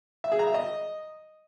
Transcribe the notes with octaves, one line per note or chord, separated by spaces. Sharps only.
E5
G#4
A#5
E5
D#5